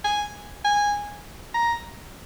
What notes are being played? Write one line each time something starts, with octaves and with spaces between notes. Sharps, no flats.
G#5
G#5
A#5